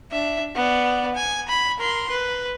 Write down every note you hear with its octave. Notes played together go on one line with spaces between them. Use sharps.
D4 E5
B3 D5
G#5
B5
A#4 C6
B4